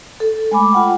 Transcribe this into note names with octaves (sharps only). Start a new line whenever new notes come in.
A4
G#3 A3 G#5 B5 D6
F4 F#5 G5